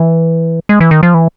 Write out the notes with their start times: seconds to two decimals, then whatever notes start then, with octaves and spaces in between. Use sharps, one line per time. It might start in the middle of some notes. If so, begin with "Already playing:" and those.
Already playing: E3
0.69 G#3
0.80 E3
0.91 D#3
1.03 F3
1.14 E3